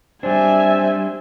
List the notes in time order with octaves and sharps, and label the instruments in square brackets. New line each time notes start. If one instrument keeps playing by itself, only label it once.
[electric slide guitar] G3 D4 [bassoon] C4 [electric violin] E5 G#5